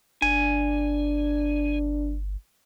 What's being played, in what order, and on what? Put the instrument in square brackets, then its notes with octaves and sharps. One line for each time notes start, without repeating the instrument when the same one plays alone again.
[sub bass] G1 [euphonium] D4 [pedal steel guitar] G#5